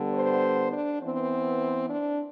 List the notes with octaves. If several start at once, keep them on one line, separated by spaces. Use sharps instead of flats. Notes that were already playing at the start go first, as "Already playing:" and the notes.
Already playing: D3 G3 B3
C5
D4
E3 B3 C4
D4